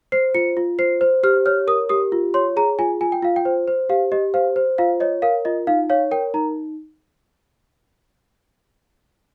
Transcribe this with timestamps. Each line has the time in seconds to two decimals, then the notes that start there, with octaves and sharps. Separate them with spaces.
0.12 C5 C7
0.35 F4 C#7
0.57 F4
0.79 C5 C7
1.01 C5
1.23 G4 F6
1.46 C#5 F6
1.67 A#4 D#6
1.89 G4 D#6
2.12 F4
2.34 C#5 C6
2.57 G#4 A#5
2.79 F4 G#5
3.01 F4 G#5
3.12 G5
3.22 F4 F5
3.36 G5
3.45 C5
3.68 C5
3.89 G4 F5
4.12 G4 D#5
4.34 C5 F5
4.56 C5
4.78 F4 F5
5.00 C#5 D#5
5.22 A#4 F5
5.45 F4 D#5
5.67 D#4 F5
5.90 C#5 F5
6.11 A#4 G5
6.34 D#4 A#5